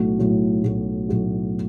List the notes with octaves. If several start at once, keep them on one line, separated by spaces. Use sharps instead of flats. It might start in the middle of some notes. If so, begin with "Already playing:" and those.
Already playing: B1 A2 A3 F#4
B1 A2 A3 F#4
B1 A2 A3 F#4
B1 A2 A3 F#4